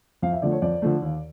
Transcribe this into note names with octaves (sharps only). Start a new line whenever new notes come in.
F2 F5
E5
D3 F3 A3 D5
C#5
F2 D5
D3 F3 A3
D#2